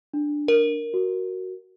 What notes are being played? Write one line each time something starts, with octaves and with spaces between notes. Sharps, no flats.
D4
A#4
F#4